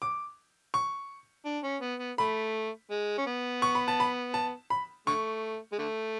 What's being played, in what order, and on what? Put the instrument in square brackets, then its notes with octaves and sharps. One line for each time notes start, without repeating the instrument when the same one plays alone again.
[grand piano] D6
C#6
[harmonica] D4
C#4
B3
B3
[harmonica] A3 [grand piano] B5
[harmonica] G#3
C#4
B3
[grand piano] C#6
B5
A5
B5
A5
B5
[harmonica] D3 A3 [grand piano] C#6
[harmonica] G#3
D3 A3